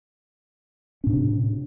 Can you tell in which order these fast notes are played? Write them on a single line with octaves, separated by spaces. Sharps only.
C#4 A2 D4 C3